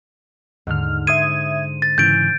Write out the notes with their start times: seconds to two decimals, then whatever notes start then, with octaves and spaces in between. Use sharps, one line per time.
0.67 D#2 G#2 D3 F6
1.07 C5 E5 D#6 G#6 D#7
1.82 A6
1.98 G#2 C#3 E3 G6 D7